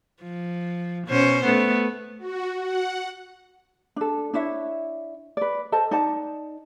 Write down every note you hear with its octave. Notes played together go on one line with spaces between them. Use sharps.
F3
B2 C#4 C5
A3 B3
F#4
F#5
D4 A4
D4 E4 C#5 E5
B4 D5
A4 C5 D#5 A5
D#4 D5 F#5 A5